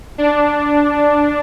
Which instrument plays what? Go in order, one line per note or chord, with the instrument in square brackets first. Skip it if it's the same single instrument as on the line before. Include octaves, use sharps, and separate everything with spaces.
[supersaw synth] D4